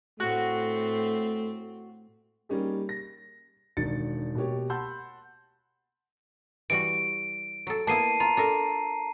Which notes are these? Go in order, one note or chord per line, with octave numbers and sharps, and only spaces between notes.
A2 A3 C4 F#4
G3 A#3 C#4 D#4 G4 G#4
A#6
E1 D#3 D4 A6 C#7
B2 A#3 G4 C#5
F#5 A5 B5 C6 E6 G6
E3 G3 F#4 D7
F#3 A4
A#3 B3 E4 A5 C7 D#7
F4 A#5
D4 A4 A#4